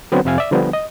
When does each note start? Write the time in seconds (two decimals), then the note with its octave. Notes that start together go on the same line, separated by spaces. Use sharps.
0.12 D3 F#3 B3 C4
0.25 F2 C3 E5 F5 G#5
0.38 D5 E5
0.52 D3 F3 G3 B3
0.73 D#5